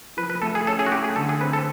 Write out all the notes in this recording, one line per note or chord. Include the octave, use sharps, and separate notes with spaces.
F3 B4
B4
A3 A4
G#4
C#4 A4
G#4
F#4
A3 G4
G#4
D3 A4
G#4
C4 B4
A4